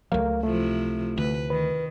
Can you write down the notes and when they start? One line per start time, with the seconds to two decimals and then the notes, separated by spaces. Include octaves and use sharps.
0.12 C#2 F#3 A3 A#4 F5
0.43 C3 F3 A3 E4
1.18 D2 B4
1.50 D#3 B4